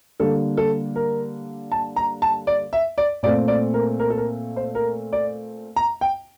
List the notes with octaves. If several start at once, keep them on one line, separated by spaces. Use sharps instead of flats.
D3 G3 A#3 A4
A4
A#4
A5
A#5
A5
D5
E5
D5
A#2 A3 C4 D5
D5
A#4
A#4
A4
A#4
C5
A#4
D5
A#5
G5